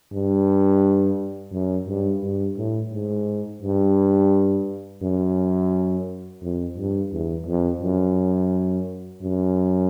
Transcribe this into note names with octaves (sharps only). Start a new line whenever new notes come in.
G2
F#2
G2
G2
A2
G#2
G2
F#2
F2
G2
E2
F2
F#2
F#2